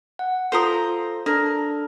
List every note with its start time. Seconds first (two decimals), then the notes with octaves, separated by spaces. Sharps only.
0.19 F#5
0.52 F4 A4 C5 A#5 D#6
1.26 D4 A4 A#4